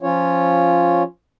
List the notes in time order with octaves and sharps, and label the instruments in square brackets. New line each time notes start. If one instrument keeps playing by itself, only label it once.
[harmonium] F3 C#4 F4 C#5